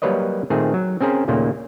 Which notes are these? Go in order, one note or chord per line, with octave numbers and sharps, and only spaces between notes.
F#3 G3 A#3 B4 C#5 D#5
A#2 D#3 A3 C4 G#4
F#3
C4 C#4 G#4 A#4 C5
D#2 A#2 C#3 A3 A#3